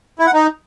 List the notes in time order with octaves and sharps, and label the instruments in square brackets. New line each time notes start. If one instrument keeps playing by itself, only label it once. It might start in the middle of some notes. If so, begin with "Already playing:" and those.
[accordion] E4
F#5
D#4